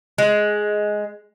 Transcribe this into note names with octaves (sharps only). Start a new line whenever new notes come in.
G#3